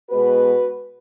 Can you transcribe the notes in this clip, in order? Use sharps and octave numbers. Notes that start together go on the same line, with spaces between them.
B2 G#3 B3 F#4 B4